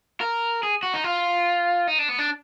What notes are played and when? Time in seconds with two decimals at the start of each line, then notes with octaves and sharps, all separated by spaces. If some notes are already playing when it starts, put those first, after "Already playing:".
0.21 A#4
0.63 G#4
0.83 F#4
0.94 D#4
1.04 F4
1.87 D#4
1.99 D4
2.09 B3
2.19 D4